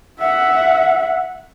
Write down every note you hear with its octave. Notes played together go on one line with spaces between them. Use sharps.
E5 F#5